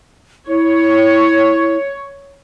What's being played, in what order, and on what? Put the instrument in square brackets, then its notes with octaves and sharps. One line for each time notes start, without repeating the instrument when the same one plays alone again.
[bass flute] E4 [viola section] C#5